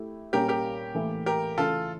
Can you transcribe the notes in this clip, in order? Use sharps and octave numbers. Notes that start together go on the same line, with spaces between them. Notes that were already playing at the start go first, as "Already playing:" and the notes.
Already playing: A3 E4 G4
A#2 G3 C#4 G4 A#4
G4 A#4
A2 E3 A#3 E4 A4
G4 A#4
C#3 E3 A3 C#4 F4 A4